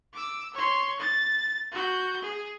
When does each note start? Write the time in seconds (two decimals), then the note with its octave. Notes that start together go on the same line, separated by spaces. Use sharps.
0.13 D6 E6
0.54 C#5 C6
1.00 A6
1.72 F#4 G6
2.22 G#4